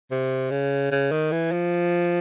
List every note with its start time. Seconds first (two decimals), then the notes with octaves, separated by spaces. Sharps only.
0.11 C3
0.51 C#3
0.91 C#3
1.12 D#3
1.32 E3
1.52 F3